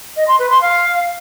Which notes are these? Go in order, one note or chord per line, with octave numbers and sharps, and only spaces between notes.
D#5
C6
B4
C6
F5